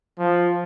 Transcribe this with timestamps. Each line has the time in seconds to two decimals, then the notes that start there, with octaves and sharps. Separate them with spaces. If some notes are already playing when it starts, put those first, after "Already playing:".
0.19 F3